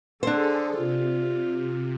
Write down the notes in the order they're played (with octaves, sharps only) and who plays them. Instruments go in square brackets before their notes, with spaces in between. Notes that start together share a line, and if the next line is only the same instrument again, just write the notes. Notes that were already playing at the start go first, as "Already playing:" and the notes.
[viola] D3 [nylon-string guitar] D4 C5 [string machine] G#4 A4
[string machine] C3 [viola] F4